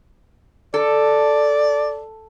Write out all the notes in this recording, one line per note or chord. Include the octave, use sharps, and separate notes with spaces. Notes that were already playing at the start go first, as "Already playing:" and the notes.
A4 D5